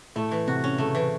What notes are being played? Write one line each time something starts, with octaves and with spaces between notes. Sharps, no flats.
A2 A3
E3
C3 F#4
C#4
C#3 A3
E3